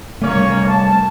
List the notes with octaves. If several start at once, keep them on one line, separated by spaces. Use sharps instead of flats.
C3 G3 A3 A#3 C#4 C#5
A5